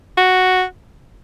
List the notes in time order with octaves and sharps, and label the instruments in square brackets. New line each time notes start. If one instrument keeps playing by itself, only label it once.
[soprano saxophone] F#4